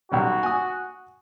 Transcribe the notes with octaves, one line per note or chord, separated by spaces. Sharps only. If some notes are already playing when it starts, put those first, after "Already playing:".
B1 G3 C#4 F#4
G#5 D#6